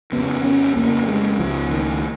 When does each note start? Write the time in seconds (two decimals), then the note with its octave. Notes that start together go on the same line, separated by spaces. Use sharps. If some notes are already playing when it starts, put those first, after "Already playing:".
0.12 F2 C#3 B3
0.44 C#4
0.76 F2 C#3 A#3
1.08 G#3
1.39 C#2 C#3 F3
1.71 D#3